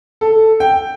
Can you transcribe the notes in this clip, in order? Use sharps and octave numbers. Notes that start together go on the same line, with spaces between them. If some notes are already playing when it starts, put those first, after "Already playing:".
A4
G5